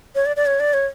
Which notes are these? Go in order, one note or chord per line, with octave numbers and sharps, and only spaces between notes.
C#5
D5
D5
C#5
D5
C#5